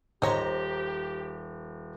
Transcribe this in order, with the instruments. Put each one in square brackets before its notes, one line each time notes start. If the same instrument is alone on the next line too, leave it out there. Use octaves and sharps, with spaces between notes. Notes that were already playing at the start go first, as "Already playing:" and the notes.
[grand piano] D#1 [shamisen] D#4 C#5 [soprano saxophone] G4 [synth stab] C5 A#5